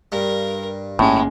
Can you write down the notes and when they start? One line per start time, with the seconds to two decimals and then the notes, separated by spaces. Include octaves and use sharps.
0.12 G2 A#4
0.99 G1 A2 G#3 A#3 C#4